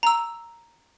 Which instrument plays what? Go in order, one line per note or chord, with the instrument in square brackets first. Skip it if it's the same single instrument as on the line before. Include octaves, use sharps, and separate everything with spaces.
[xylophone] A#5 E6